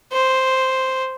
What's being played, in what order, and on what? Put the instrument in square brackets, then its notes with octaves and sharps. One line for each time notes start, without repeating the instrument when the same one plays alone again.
[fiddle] C5